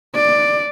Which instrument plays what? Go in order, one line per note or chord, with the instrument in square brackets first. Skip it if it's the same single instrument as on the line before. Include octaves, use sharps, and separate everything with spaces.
[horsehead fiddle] D5